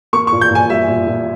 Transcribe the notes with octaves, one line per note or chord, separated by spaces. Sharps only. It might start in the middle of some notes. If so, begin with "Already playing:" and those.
A#3 C#6
C#6
A#2
G6
A#2 G#5
G3 E5
A#2
A#2